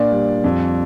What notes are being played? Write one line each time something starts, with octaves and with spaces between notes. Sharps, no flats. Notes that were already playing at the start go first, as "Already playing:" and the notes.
Already playing: A#2 D4 D5
G3
F2